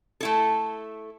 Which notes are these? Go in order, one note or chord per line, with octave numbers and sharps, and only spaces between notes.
A3 E4 A4